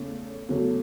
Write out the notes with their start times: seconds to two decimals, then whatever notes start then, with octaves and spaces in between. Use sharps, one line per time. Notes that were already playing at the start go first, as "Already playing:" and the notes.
Already playing: E2 C#3 A3 C#4
0.48 E2 C#3 F#3 A3 C#4